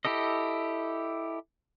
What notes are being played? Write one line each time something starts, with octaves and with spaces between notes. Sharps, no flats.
E4 G4 A4 D#5